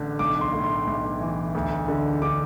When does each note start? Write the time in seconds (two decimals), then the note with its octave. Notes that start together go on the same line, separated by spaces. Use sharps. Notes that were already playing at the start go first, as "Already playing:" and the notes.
Already playing: A1 D3
0.19 B1 D6
0.41 C6
0.53 A2
0.64 C6
0.87 B1
1.21 E3
1.55 D2
1.88 D3
2.22 D3 D6